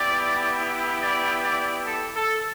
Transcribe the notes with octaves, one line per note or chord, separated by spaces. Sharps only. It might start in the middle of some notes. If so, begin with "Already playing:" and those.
Already playing: B3 E4 G4 D5
D5
D5
A4
A4